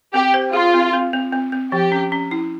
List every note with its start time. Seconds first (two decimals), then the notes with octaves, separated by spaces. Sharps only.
0.14 C4 G4
0.34 C5
0.53 F4 G#4
0.74 C4
0.93 C4
1.13 C4
1.33 C4
1.52 C4
1.72 F3 G4
1.92 C#4
2.12 C#4
2.31 E4